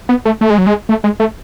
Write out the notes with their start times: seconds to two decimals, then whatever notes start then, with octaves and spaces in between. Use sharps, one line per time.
0.09 B3
0.25 A3
0.41 A3
0.50 G#3
0.58 F#3
0.66 G#3
0.89 A3
1.04 G#3
1.20 A3